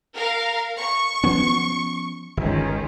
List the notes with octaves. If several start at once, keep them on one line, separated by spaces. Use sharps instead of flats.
A#4 F5
C#6
F3 B3 C#4
G1 C#2 D#3